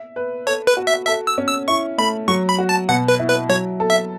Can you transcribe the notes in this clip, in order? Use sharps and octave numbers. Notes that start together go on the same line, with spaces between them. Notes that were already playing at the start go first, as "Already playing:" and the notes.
Already playing: E5
B4
A4 C#5
B4
F#4
E5
A4 E5
E6
C#4
E6
E4 C#6
A3 B5
F#3 C#6
B5
F#4
A5
B2 F#5
B4
E4
B4
F#3 C#5
A4
E5